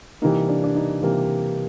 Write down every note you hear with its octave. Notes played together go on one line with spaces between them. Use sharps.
C3 E3 G3 A#3 D#4
D4
D4
D#4
C3 E3 G3 A#3